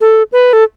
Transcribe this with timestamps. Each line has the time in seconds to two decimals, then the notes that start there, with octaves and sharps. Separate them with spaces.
0.01 A4
0.32 B4
0.53 A4